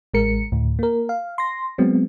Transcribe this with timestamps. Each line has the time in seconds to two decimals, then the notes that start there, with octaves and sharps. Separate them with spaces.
0.14 A1 G#3 A#4 C#7
0.52 D2 A2
0.79 A#3 A#4
1.09 F5
1.38 C6 A#6
1.78 F#3 G#3 B3 C4